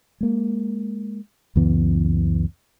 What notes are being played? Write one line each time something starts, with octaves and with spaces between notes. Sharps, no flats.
G#3 A#3
C#2 F#2 E3 B3